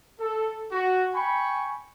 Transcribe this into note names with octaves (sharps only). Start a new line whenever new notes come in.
A4
F#4
G5 G#5 B5 C#6